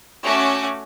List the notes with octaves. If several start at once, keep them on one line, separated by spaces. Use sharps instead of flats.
A3 C#4 F#4 D6